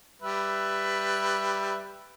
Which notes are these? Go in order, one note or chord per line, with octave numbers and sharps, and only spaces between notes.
G3 B4 E5